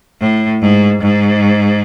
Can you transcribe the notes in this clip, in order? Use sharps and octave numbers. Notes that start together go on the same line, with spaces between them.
A2
G#2
G#2